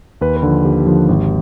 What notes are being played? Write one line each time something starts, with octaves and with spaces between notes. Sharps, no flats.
D#2 B4
B4
D3 F3
D#2 G4
D3 F3
G#1